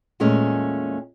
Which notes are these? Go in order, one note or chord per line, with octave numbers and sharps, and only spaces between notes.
E2 A#2 G#3 A3 C#4